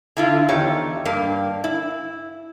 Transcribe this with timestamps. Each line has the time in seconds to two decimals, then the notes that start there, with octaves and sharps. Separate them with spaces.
0.17 D3 E4 F4
0.49 E2 D#3 G4 C#5
1.05 G2 A#3
1.64 E4